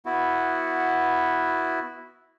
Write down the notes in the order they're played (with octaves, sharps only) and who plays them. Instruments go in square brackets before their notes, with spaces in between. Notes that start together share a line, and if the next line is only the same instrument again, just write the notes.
[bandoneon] B3 E4 F#4